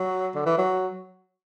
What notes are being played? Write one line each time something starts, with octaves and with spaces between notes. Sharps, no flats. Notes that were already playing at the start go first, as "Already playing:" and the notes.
Already playing: F#3
D3
E3
F#3